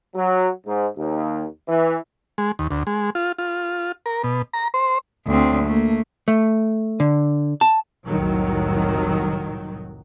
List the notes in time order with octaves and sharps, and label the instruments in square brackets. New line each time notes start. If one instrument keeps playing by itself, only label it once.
[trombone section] F#3
G#2
D#2
E3
[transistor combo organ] G#3
D#2
D2
G#3
F4
F4
A#4
B2
A#5
C5
[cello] D2 C4
A3 A#3
[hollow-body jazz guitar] A3
D3
A5
[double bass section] F1 C2 A2 D#3 F#3